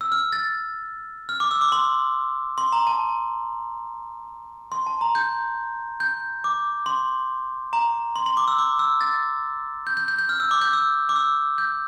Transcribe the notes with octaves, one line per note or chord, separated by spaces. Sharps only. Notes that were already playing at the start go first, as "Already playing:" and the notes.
E6
F6
A6
F6
D6
E6
D6
C6
C6
A#5
A5
C6
A5
A#5
G6
G6
D6
C6
A#5
C6
C6
D6
E6
D6
E6
A6
G6
G6
G6
G6
F6
E6
D6
G6
E6
D6
E6
G6